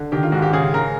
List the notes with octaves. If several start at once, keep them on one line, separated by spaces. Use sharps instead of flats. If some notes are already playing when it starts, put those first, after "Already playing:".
Already playing: D3
D#3 G4
F4
G#2 F#4
G4
C#3 G#4
C#3 A#4